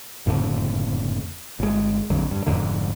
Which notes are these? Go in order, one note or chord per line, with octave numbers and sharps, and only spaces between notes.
F#1 F2 A2 D3
G1 G#3
A#1 F2 D3 F#3
G2
F1 F2 G#2 D3